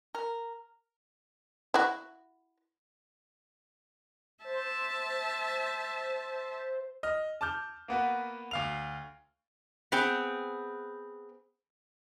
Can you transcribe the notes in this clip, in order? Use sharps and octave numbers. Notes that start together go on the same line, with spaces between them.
A#4
E4 F#4
C5 E5 A5
D#5 F6
A5 D6 F6 G6
A#3 B3 F#4 B4
D2 F5 F7
B3 C4 G#4 G5